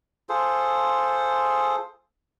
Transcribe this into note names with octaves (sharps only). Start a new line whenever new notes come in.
F4 G#4 A4 C5